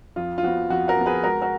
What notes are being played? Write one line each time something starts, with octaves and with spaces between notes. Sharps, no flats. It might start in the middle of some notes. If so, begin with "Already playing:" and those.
F2 F4
F4
F3 B3 F#4
F2 F#4
F#4 A#4
F3 B3
G#4 B4
G#2 F#4 A#4
F#4 A#4